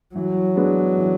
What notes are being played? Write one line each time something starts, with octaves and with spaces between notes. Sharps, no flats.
E3 F#3
G#3 B3 D4
E3